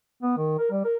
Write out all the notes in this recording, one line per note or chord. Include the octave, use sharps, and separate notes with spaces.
B3
D#3
A#4
G3
A#4